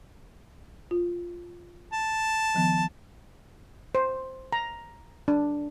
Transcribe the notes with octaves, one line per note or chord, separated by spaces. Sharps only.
F4
A5
D#3 F3 B3
C5
A#5
D4